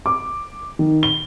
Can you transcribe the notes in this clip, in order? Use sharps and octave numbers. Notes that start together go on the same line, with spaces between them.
D6
D#3
G7